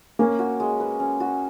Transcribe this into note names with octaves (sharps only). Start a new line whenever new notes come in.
A#3 C#4
F#4
G#3
B4
C#4
F#4